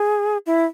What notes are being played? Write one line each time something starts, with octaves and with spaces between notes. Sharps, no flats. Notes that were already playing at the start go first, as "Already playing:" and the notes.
Already playing: G#4
E4